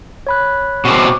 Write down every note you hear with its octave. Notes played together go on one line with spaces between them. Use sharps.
C#5 B5 F#6
B2 C4 D4 C#6 D6